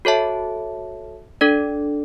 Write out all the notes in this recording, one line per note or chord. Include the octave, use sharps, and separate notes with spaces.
F#4 A4 C#5 E5 A5
D4 A4 D5